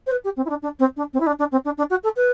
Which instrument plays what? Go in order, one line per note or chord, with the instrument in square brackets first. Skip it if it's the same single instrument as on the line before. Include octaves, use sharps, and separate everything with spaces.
[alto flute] C5
B4
G4
C4
E4
D4
D4
C4
D4
C4
E4
D4
D4
C4
D4
D4
F#4
A4
B4